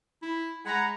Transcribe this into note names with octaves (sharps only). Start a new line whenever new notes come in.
E4
G#3 F#5 A#5 B5